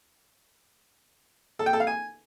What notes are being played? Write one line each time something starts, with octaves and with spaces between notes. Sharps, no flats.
A4
G5
A4
F5
G#5